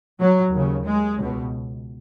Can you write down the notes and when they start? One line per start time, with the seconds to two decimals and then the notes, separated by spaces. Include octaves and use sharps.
0.20 F#3
0.52 D#2 C#3
0.85 G#3
1.17 C#2
1.22 B2